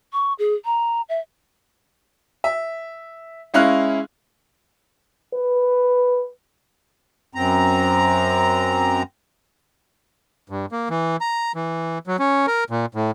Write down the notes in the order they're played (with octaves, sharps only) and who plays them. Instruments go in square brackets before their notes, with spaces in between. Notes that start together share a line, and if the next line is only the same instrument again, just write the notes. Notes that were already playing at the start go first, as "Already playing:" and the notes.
[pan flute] C#6
G#4
A#5
E5
[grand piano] E5
G#3 C#4 E4 F5 F#6
[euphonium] B4
[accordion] F#2 C4 A#5
[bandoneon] G2
A#3
E3
A#5
E3
F#3
C#4
A#4
A#2
A2